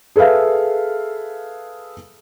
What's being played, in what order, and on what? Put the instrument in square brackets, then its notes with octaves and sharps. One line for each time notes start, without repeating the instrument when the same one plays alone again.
[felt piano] G#4 A4 B4 E5 F5